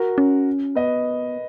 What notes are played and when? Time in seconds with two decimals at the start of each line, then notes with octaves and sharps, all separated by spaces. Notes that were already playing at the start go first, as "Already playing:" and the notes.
Already playing: F#4 A#4
0.18 C#4
0.75 B3 B4 D#5